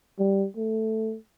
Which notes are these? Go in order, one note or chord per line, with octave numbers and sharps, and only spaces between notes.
G3
A3